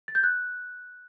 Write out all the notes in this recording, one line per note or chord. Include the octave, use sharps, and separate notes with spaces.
A6
G6
F#6